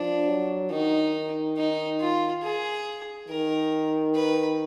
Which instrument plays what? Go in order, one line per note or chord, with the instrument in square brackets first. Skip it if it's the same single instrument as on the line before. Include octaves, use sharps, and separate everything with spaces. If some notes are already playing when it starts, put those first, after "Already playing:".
Already playing: [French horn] F3 [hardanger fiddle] D4
[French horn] F#3
[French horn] D#3 [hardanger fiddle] D#4
[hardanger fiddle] D#4
F4
G#4
[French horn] D#3 [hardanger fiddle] A#4
[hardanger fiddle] B4